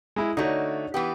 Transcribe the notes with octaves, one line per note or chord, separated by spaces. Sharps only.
G#3 E4
D3 A3 D#4 F#4 C#5
E3 B3 G4